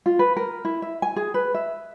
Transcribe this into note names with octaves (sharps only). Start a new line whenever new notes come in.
F4
B4
A#4
E4
E5
G#5
G#4
B4
E5